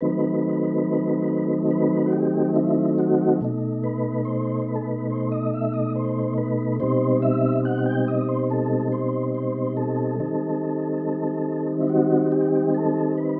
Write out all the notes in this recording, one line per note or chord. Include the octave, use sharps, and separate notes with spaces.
D#3 F#3 A3 C4 D#4 B4
B4
F#4
G4
E4
F#4
B2 A3 D#4
B4
C5
B4
A4
B4
C5
D#5
E5
D#5
C5
B4
B2 G3 C4 D#4 C5
E5
F#5
G5
D#5
C5
A4
C5
C5
A4
D#3 G3 C4 D#4
E4
F#4
G4
A4
B4